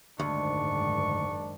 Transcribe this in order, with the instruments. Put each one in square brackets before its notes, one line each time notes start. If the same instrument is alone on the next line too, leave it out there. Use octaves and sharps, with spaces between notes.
[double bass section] F#1 G#2 D#3 [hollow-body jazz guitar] D2 [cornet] D4 [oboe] C#6